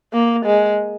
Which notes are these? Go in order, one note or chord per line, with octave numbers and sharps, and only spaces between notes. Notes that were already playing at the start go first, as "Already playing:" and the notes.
A#3
G#3